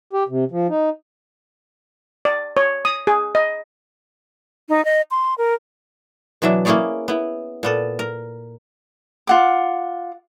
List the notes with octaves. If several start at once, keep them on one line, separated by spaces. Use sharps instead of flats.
G4
C3
F3
D#4
D5
C#5
D#6
G#4
D#5
D#4
D#5
C6
A#4
B2 E3 F#3 D4 E5
A#3 C#4 E4 G#4 C#5 D5
B3 E4
A#2 B3 A4
A#4
F4 F#5 D6